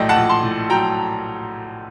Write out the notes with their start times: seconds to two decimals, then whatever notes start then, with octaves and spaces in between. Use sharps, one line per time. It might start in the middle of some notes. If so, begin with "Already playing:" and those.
Already playing: A#1 A2 F#3 A3 D5 D#5 G5
0.09 F#5 A5
0.16 A#1
0.29 A5 C6
0.43 A2
0.70 F#3 G5 A#5